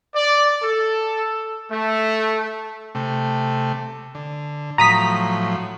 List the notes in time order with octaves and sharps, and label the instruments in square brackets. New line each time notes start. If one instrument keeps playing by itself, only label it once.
[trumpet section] D5
A4
A3
[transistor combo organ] C3 A3
D3
[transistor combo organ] A2 F3 F#3 [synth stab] A#5 D#6 B6